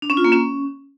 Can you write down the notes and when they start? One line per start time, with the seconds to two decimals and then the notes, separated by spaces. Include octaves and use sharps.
0.02 D4
0.10 C#4
0.17 F4
0.25 A#3
0.32 C#4